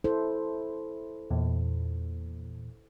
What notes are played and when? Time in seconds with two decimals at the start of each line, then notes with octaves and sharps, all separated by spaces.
0.04 E4 A4 C5
1.30 E2 A#2